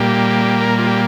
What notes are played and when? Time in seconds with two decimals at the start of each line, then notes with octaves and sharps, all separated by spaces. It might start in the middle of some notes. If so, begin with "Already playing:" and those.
Already playing: A#2 G3 A#3 G4
0.61 A#4
0.78 F4
0.87 G4